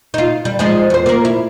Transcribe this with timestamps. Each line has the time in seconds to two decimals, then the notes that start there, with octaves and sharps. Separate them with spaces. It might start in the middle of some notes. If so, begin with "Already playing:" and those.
0.14 D#4 F4
0.45 G3
0.59 F3 G#3 D#4
0.90 E2 C5
1.06 A#3 A#4
1.25 E4